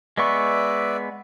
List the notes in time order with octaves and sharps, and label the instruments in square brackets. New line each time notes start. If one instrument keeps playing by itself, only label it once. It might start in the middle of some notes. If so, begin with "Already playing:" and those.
[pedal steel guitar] G#3 B3 C#6 [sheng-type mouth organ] B4 D5 E5